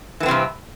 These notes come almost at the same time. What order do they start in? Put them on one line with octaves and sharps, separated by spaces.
E3 B3 C4 C3 G2